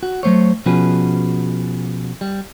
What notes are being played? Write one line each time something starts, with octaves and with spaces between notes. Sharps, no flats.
F#4
F#3 A3 C5 C#5
B2 F3 C#4 F#4 G#4 B4
G3